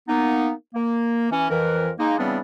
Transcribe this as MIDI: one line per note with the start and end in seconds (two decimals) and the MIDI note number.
0.08 0.51 58
0.08 0.51 59
0.08 0.51 63
0.74 1.29 58
1.31 1.50 52
1.31 1.50 61
1.50 1.90 41
1.50 1.90 52
1.50 1.90 70
1.99 2.17 56
1.99 2.17 58
1.99 2.17 63
2.19 2.39 49
2.19 2.39 52
2.19 2.39 55
2.19 2.39 59
2.19 2.39 60
2.19 2.39 62